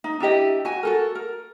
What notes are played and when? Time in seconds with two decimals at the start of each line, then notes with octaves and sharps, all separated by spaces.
0.04 D#4
0.20 D4 E4 G4 D#5
0.65 F#4 G#5
0.83 F#4 A4 A#4
1.15 A#4